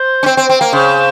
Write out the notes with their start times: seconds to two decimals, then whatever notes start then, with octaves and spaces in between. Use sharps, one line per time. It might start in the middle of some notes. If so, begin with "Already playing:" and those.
Already playing: C5
0.23 C#4
0.26 C4
0.37 C4
0.49 C4
0.61 A#3
0.73 C#3 C5